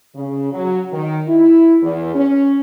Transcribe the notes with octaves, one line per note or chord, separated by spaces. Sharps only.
C#3
F#3
D#3
E4
E2
C#4